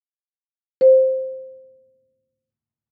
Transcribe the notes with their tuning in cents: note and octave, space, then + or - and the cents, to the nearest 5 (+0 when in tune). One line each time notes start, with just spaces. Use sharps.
C5 +5